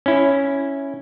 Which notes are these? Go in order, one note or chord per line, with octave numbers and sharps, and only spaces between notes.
C#4 E4